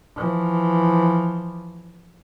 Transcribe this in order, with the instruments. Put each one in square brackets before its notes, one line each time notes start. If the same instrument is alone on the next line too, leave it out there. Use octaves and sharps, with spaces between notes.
[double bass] E3 F3